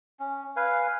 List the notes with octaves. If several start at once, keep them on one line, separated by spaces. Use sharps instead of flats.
C#4
B4 F5 G#5